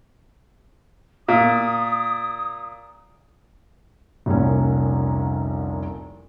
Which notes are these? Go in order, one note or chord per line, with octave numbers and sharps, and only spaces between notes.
A#2 D#6
F1 C2 A#2 C#4